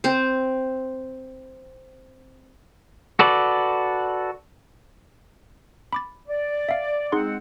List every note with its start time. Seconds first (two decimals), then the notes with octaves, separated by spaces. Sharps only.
0.04 C4 C5
3.19 F#4 A4 B4 D5
5.93 B5 D6 A6
6.28 D5
6.69 E5 F5
7.12 G#3 C4 D#4 G#4 F#5 C6